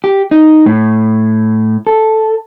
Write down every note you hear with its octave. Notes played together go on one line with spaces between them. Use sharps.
G4
D#4
A2
A4